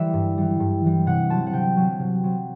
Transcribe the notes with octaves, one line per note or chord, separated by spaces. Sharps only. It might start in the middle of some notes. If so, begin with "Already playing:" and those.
Already playing: E3 G3 C5 D5 E5
G2
E3 G3
G2
E3 G3
C3 F#5
F#3 C4 A5
F#5
C3 G5
F#3 C4
C3
F#3 C4